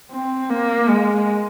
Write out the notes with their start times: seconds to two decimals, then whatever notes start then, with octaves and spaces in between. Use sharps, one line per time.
0.11 C4
0.50 A#3
0.89 G#3